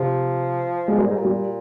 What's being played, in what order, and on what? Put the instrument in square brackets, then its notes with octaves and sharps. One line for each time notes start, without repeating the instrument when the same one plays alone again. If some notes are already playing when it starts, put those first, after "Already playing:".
Already playing: [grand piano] C3 [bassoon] F3
[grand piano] G#3
[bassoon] A#2 [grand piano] G3
[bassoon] G#2
A#2
[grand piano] G3